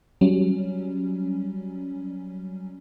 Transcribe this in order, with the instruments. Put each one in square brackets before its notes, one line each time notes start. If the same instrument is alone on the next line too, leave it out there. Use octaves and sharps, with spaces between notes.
[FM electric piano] F#3 G3 C#4